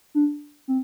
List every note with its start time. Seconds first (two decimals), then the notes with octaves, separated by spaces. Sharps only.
0.15 D4
0.68 C4